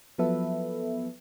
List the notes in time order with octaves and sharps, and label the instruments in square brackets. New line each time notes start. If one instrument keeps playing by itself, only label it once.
[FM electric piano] F3 F#3 B3 A4 B4 E5